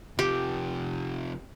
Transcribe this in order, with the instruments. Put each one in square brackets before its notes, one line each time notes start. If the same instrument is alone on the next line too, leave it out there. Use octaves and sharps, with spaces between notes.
[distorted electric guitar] C3 F3 [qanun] G4